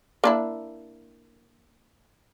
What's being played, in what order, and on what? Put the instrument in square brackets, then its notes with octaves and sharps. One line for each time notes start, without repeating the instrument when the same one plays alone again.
[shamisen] A#3 D4 E4